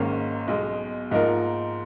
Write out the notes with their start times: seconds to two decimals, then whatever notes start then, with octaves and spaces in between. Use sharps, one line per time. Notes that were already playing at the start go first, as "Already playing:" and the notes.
Already playing: G#1 G#2 D#3 A#3 C#4
0.48 B1 B2 G#3
1.11 G#2 F3 A#3 D#4 A#4